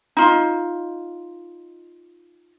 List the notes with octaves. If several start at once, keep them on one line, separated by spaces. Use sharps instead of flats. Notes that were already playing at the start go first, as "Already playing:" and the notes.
D#4 F4